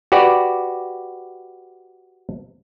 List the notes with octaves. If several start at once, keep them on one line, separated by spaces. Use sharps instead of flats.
F#4 G4 B4 D5